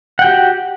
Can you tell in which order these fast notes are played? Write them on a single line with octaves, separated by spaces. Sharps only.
F#5 G5 F#4 G4